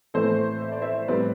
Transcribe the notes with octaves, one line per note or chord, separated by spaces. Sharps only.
A2 E3 A3 C4 A4 C5
E5
D5
C5 E5
A2 G3 C4 B4 D5